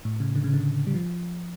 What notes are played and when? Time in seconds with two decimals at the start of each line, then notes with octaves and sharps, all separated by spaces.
0.05 A2
0.20 C#3
0.36 D3
0.44 C#3
0.54 D3
0.87 G3
0.94 F3